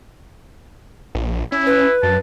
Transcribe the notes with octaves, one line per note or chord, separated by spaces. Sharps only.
A#1
C#4 E4
B4
F#2 A5